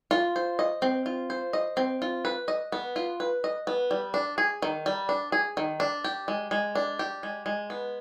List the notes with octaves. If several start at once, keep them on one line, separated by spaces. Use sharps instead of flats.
F4
C5
D#5
C4
F4
C5
D#5
C4
F4
B4
D#5
B3
F4
B4
D#5
B3
G3
D4
G#4
D#3
G3
D4
G#4
D#3
D4
G4
G#3
G#3
D4
G4
G#3
G#3
B3